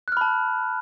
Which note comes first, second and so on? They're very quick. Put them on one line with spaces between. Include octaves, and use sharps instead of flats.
F#6 F6 B5 A5